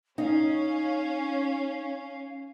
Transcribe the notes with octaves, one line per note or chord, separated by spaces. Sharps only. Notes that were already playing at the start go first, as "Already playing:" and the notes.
C#4 D#4 F5